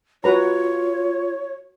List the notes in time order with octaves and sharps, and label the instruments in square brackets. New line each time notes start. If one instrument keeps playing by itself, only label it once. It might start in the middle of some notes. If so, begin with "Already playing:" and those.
[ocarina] F4 [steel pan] F#4 B4 A#5 [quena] C#5